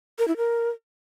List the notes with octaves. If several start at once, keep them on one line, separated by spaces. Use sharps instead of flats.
A#4
E4
A#4